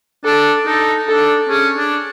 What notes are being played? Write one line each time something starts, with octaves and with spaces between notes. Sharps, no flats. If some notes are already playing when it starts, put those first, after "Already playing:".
D4 A4
D#4 A4
D4 A4
C#4 G#4
D4